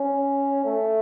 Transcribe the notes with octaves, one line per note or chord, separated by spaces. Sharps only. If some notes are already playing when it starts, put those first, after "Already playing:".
Already playing: C#4
A3